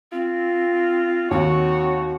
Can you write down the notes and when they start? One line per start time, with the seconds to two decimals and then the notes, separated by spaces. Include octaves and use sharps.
0.12 C4 F4
1.31 D#2 C4 F#4 C#5